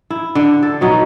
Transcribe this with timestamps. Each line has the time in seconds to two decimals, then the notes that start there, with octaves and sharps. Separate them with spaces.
0.10 E4
0.35 D3
0.63 A4
0.81 B2 F#3 D#4